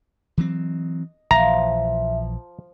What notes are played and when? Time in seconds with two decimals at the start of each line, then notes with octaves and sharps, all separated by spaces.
0.38 E3 F#3 C4 D#5
1.31 A#1 E3 F3 E5 A#5